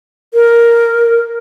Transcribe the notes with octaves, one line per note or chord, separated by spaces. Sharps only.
A#4